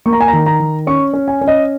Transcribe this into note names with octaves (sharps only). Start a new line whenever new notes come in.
A#3 C#6
A#5
G#5
A#5
D#3
A#5
D#3
C#4 C#6
C#4
G#5
C#4
D#5